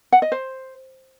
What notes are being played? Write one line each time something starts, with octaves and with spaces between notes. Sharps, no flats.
F#5
D#5
C5